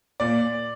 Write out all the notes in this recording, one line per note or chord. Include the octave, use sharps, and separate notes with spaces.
A#2 D5